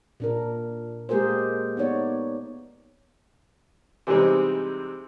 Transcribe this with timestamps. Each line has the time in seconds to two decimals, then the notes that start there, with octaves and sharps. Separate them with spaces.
0.20 A#2 D4 A#4
1.09 G#3 A#3 G4 G#4 A#4 C5
1.77 B3 D#4 C#5 D5
4.07 C3 E3 G3 G#3 C4 D#4